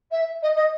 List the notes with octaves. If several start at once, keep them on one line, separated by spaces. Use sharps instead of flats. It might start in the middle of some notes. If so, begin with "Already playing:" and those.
E5
D#5
D#5